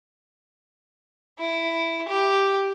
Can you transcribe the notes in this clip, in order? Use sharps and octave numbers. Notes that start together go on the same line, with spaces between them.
E4
G4